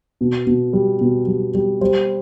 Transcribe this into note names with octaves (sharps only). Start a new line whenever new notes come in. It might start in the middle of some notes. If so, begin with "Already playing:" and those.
B2
B2
G3
B2
G3
G3
G3 C5